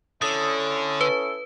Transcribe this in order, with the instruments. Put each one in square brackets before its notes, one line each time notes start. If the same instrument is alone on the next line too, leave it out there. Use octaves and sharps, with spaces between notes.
[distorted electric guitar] D3 [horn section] C#4 E4 A4 [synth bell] D#6
[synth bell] B4